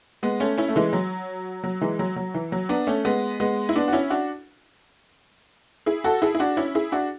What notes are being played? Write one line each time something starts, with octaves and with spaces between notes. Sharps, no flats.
G#3 B3
A3 C#4
C#4 E4
A3
E3 G#3
F#3
F#3
E3 G#3
F#3
F#3
E3
F#3
B3 D4
A3 C#4
G#3 B3
G#3 B3
E4
B3 D4
F#4
C#4 E4
D4 F#4
E4 G#4
F#4 A4
E4 G#4
E4
D4 F#4
C#4 E4
E4 G#4
D4 F#4